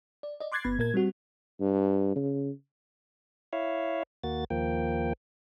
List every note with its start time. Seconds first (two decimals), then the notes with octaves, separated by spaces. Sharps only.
0.23 D5
0.40 D5 D#5
0.52 C6 D6 F#6 G#6 A6 C7
0.64 G1 B3 B5 G#6
0.79 A#2 A#4 G#6
0.94 G3 C4 F#4
1.60 G2
2.16 C#3
3.53 E4 C#5 E5 F5
4.23 D#2 A#3 F#4 A6
4.50 D#2 F3 A#3 G5